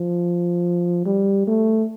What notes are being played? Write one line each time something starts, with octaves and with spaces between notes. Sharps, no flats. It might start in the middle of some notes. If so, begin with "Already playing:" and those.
Already playing: F3
G3
A3